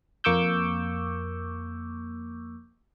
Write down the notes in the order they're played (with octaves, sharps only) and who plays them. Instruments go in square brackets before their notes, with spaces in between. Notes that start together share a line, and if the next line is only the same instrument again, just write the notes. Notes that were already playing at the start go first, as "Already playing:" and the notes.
[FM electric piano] F2 A#3 C#6 D6 E6 G6